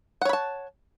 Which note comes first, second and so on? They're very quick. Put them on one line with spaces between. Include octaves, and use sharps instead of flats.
F#5 C#5 B5 A5